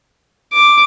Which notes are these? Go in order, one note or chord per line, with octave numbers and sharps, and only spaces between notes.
D6